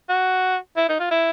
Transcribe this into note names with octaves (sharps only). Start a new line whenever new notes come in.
F#4
E4
D#4
F4
E4